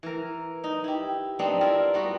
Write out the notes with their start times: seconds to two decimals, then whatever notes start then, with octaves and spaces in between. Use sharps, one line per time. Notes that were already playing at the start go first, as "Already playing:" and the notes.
0.03 E3 A#4
0.64 D#4
0.84 E4 G4
1.39 B3 C4 D4 D#4
1.61 E4 F4 A#4 E5
1.94 G3 B3 F#4